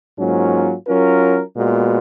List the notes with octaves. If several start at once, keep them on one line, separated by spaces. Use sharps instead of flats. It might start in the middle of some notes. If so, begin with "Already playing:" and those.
G#2 F#3 A#3 C#4 F4
F#3 C#4 F4 A#4
A#2 G#3 B3 F#4